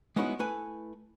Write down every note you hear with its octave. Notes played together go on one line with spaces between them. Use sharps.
G#3 B3 C#4 D#4 E4 F#4
A3 E4 B4 G#5